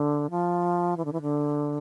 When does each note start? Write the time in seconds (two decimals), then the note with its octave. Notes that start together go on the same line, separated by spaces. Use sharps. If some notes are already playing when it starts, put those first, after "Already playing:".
Already playing: D3
0.30 F3
0.97 E3
1.05 D3
1.13 E3
1.21 D3